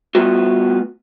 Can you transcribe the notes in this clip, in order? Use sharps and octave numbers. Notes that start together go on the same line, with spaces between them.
G3 A3 B3 F4 F#4